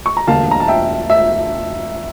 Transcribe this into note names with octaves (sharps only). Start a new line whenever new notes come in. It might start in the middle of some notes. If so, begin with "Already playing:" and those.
C#6
A#5
E1 D2 D3 G3 A#3 F5 A5
A#5
A5
E5 G5
E5